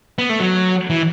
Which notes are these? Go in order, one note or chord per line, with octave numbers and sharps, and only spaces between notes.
B3
A3
F#3
E3